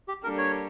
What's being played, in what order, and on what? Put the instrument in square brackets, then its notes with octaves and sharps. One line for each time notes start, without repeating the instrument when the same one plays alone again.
[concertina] G4
[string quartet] G3 A#3 D4 A4 [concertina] A#4
[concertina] C#5